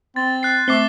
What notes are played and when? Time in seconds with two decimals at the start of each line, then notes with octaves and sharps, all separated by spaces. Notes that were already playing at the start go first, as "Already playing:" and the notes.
0.16 C4 A6
0.43 F#6 C7
0.68 A3 C4 D6 C7 G7